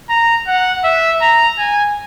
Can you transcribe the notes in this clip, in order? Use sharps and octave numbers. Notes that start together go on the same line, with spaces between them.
A#5
F#5
E5
A#5
G#5